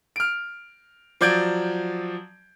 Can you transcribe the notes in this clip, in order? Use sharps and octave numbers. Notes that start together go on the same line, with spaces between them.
F6 D7
F3 F#3 D5 G6 G#6 D7